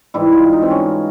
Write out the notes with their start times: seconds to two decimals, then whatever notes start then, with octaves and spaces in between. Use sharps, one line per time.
0.14 G#2 E3 G3 E4
0.33 F4
0.53 D#4
0.62 C4
0.71 C#4